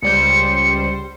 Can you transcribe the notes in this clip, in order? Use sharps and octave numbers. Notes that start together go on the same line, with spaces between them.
C#2 G3 C5 C#7